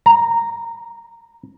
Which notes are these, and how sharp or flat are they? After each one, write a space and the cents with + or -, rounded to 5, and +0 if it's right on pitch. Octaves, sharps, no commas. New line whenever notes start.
A#5 -10